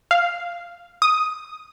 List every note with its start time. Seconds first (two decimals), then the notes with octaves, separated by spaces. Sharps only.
0.11 F5
1.02 D#6